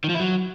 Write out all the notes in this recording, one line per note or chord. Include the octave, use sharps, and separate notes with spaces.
D#3
F3
E4
F#3